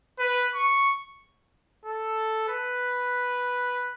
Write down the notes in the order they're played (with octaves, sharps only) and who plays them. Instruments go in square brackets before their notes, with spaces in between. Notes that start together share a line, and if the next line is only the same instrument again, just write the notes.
[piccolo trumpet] B4
C#6
A4
B4